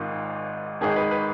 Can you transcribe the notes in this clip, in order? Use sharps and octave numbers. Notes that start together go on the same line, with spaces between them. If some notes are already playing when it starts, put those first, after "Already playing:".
Already playing: G#1 G#2 D#3 F4
G#1 G#2 D#3 G#4
B4
B4